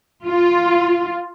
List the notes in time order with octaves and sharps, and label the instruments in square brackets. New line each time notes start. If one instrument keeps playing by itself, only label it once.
[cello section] F4